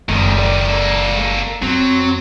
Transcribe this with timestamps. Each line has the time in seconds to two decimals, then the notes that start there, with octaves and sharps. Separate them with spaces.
0.09 F#1 F2 G#2 D#3 G3
0.38 G#3 D5
0.67 A#3 A4
1.62 F2 F#3 C4